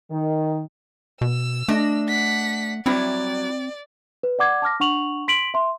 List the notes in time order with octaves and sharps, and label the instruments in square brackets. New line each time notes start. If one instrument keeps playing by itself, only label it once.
[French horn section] D#3
[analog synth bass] B2 [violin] E6
[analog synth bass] A3 [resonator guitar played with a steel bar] D4 D#5
[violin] F#5 B6
[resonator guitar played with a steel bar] F#3 G3 E4 [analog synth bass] C4 [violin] D5
[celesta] B4
D5 F#5 D6 G#6
A5 D6 F6 A#6
D4 F#5 C#6 F7 F#7
C6 B6 D7 F#7
E5 C6